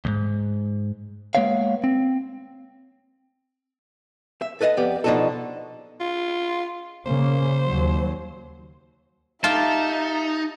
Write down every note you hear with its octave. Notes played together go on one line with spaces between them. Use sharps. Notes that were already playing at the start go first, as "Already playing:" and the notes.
D2 G#2
G#3 A#3 B3 C#5 F5
C4
E5
A4 B4 D#5 F5 F#5
F2 B3 G4 D5
B2 F3 D4 D#4 F#4 A4
F4
C#3 A#3 C5
D#2 F#3
D#4 F4 G4 E5 G5 A5